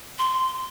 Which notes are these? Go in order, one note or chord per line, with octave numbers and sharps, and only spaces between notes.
C6